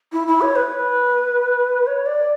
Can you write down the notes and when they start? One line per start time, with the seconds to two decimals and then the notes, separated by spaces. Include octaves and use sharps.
0.12 E4
0.27 E4
0.41 C#5
0.56 B4
1.87 C#5
2.06 D5